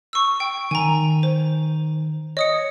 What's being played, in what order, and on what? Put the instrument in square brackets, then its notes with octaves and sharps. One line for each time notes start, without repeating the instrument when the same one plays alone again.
[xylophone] C#6 E6
G5
[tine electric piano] D#3 [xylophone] G#5 A#5
[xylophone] C5
[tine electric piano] C#5 [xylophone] D#5 D#6 C#7